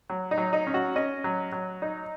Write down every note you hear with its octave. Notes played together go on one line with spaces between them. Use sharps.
F#3
D#4
F#3
D#4
C#4
F#4
C#4 D#5
F#3
F#3
D#4